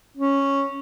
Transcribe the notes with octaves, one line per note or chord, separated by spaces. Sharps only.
C#4